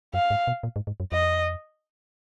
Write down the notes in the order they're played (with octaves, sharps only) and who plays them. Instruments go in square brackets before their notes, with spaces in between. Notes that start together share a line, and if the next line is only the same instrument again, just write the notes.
[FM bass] F#2 [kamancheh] F5
[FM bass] G#2
B2
A#2
G#2
G#2
F#2
[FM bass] F2 [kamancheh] D#5